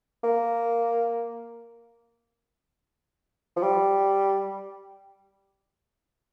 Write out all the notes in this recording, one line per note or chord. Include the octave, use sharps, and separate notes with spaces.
A#3
F3
G3